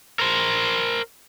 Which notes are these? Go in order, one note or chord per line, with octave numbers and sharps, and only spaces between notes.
A#4 C5